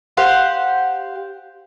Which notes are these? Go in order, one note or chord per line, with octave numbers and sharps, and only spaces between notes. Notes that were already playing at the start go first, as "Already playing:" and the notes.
G4 C5 F5 F#5